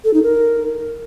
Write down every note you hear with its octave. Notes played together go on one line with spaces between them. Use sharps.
A4
D#4
A#4